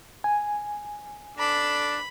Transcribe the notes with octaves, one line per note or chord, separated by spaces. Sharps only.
G#5
D4 A4 D5 B5